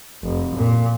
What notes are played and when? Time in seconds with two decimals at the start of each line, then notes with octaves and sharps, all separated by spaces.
0.23 F1
0.55 A#2